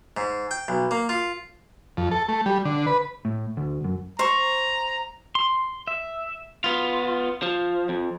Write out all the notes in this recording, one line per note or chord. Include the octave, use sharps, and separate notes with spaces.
G#2
G5
B1
A#3
F4
F2
A4
A3
G3
D3
B4
A2
D2
F#2
C5 A#5 C#6
C6
E5
B3 F4
F3
F2